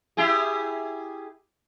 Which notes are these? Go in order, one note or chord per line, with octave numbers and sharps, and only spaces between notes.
E4 G4 G#4